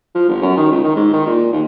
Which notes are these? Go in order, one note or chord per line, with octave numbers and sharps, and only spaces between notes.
F3
G1
F#2
D#3
C#2
D#3
G#2
D#3
A#2
D#2